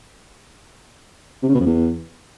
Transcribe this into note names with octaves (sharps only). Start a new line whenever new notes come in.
C3
C#3
B2
F2
E2